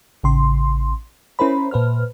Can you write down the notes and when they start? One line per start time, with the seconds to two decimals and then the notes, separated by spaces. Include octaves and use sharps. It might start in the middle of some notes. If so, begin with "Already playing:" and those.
0.23 A1 C#3 C6
1.39 C#4 E4 A#4 C5 B5
1.71 A#2 B4 C5 F6